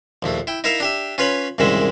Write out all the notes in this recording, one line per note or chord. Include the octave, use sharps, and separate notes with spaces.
A#1 D#2 A3
E4 G5
D#4 E4 A#4 E5 F5
D4 G4 E5
C#4 F4 B4 C#5 B5
C2 F#2 A#2 D#3 G#3 E5